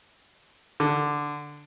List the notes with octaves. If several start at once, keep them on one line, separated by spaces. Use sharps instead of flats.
D3